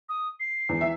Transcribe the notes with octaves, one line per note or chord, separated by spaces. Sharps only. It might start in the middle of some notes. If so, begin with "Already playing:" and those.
D#6
C7
E2
E3 E5